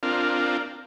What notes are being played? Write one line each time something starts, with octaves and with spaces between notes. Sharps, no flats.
C4 D4 F4 A#4